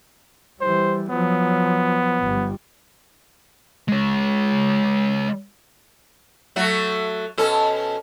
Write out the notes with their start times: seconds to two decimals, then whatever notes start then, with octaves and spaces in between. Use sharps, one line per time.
0.61 E3 G3 C5
1.10 F3 F#3 B3
2.21 G1 G3
3.89 G#3 C#5
6.56 F#3 A3 F#4
7.38 B2 C#4 A4